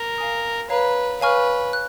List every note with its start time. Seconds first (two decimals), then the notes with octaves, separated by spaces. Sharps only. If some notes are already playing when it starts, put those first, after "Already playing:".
Already playing: A#4
0.18 F5 G#5 D#6
0.69 B4 C#5 F5 A#5
1.21 B4 C#5 F5 G#5 C#6 F6
1.73 F#6